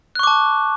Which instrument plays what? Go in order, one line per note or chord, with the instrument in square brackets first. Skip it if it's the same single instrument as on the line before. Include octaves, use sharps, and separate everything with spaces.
[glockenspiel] F#6
C#6
D6
A5